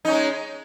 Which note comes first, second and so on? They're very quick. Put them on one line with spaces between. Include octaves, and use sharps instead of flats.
D#4 C#4 G#3